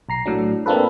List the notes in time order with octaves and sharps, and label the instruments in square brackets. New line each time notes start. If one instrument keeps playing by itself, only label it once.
[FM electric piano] B1 A#5 C7
A2 F#3 D4
A#3 C4 D4 F4 A4 B4